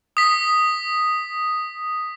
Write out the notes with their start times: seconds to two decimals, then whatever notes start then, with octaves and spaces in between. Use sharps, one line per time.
0.17 D#6 B6